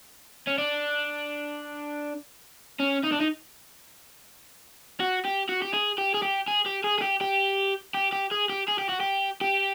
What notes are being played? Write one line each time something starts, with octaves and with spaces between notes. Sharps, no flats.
C#4
D4
C#4
D#4
D4
D#4
F#4
G4
F#4
G4
G#4
G4
G#4
G4
G#4
G4
G#4
G#4
G4
G4
G4
G4
G#4
G4
G#4
G4
F#4
G4
G4